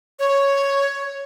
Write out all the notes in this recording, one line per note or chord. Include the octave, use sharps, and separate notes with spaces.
C#5